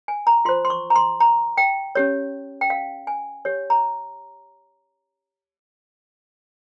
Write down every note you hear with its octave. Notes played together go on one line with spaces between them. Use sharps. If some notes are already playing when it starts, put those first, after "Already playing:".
G#5
A#5
F4 C5 C6
C6
C#6
A#5
C6
A#5
G5
C#4 G4 C#5
G5
F5
G#5
G4 C#5
A#5